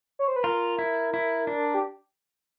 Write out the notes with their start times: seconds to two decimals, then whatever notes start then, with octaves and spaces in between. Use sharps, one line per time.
0.19 C#5
0.28 C5
0.36 B4
0.43 F4 A#4
0.79 E4
1.14 E4
1.47 D4
1.74 G4